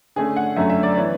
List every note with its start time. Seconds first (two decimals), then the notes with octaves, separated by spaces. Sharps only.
0.16 D3 A3 C#4 G#4
0.36 F#5
0.57 F#2 D3 A3 C#4 E5
0.70 E5
0.83 D5
0.96 E3 B3 C#5